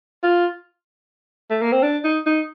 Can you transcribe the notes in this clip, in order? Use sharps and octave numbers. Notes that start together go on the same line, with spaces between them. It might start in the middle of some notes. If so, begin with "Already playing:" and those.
F4
A3
A#3
C4
D4
D#4
D#4